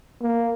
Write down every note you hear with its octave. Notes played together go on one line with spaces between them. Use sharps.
A#3